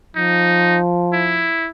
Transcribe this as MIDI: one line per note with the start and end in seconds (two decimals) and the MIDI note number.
0.16 1.52 53
0.16 0.79 63
1.13 1.69 64